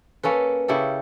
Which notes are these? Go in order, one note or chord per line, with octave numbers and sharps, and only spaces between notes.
A#3 C#4 A4 B4
C#3 E4 G4 A4